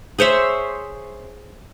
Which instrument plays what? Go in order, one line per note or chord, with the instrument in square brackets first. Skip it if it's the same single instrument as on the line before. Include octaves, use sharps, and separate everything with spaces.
[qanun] G#4 C5 C#5 E5